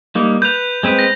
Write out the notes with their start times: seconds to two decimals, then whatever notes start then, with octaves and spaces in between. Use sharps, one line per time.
0.15 G3 A#3 D#4
0.42 B4 G6 F7
0.83 G#3 C4 B4
0.99 A#6